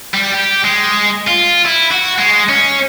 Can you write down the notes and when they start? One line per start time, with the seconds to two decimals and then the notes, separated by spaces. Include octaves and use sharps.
0.14 G3
0.33 G4
0.64 G#3
1.27 F4
1.65 E4
1.91 F#4
2.18 G#3
2.49 C#4